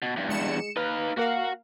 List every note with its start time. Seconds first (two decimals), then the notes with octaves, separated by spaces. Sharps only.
0.02 B2
0.16 E2 G2
0.29 G#3 C#7 E7
0.76 D#4 B4 F5
1.17 A#3 F#4 A#4 F5 F#5